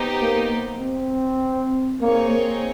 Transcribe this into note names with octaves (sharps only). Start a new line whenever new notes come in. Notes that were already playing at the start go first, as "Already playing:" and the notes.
Already playing: B3 D#4 G4 C5
A#3
C4
A#3 C4 D#4 G#4 C#5
A#3